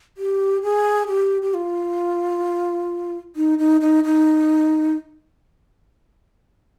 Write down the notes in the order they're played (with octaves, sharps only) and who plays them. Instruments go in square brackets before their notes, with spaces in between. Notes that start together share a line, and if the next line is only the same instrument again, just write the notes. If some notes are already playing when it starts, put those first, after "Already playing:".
[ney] G4
G#4
G4
G4
F4
D#4
D#4
D#4
D#4